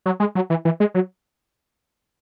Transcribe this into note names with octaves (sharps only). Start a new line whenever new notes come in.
F#3
G#3
F#3
E3
E3
G#3
F#3